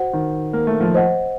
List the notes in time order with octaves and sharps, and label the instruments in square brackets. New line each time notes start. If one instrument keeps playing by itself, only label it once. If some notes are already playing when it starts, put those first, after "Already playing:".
Already playing: [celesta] F#4 C5 F#5
[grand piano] D#3
A#3
A3
F3
[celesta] C5 D#5 F#5